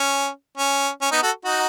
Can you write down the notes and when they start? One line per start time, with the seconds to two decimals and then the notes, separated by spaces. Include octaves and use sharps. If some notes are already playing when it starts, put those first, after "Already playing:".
Already playing: C#4
0.58 C#4
1.01 C#4
1.12 B3 D#4
1.23 F#4 A4
1.45 D#4 F#4